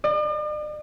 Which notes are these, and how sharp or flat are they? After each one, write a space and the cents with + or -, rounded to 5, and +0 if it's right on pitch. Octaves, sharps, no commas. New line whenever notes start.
D5 +45